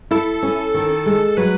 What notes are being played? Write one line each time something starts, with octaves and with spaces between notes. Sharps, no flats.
E4 A4
C#4
D#3
G#3
F#3 B4